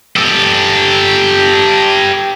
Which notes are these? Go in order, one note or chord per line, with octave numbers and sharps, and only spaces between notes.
G4 A4